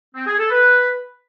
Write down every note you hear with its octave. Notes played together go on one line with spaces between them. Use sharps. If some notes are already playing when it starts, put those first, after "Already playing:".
C4
G#4
A4
B4